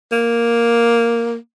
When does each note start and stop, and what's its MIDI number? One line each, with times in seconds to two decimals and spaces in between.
0.12 1.36 58